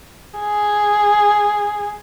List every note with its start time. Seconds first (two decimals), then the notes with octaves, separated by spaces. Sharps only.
0.40 G#4